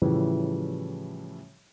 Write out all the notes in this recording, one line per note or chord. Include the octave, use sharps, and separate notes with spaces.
A2 C#3 E3 F3 G3